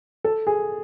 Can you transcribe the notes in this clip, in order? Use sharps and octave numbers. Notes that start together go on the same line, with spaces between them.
A4
G#4